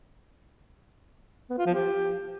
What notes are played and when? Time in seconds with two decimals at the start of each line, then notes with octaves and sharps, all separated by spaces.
1.50 B3
1.58 F4
1.66 F3
1.74 G4